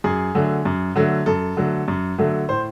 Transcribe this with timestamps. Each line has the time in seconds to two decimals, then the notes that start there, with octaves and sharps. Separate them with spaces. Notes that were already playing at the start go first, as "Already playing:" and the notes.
0.04 F#2 G#4
0.35 D3 F#3 A3
0.65 F#2
0.96 D3 F#3 A3
1.26 F#2 A4
1.57 D3 F#3 A3
1.88 F#2
2.18 D3 F#3 A3
2.49 A2 C5